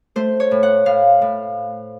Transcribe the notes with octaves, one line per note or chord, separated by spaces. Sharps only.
A3 C5
C#5
A2
F#5
A2 F5
A2